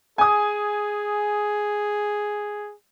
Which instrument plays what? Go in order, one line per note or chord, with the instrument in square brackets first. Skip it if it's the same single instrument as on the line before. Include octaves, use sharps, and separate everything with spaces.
[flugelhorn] G#4 [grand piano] G#5 D#6